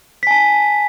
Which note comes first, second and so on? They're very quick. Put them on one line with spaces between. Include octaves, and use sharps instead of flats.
B6 G#5 A5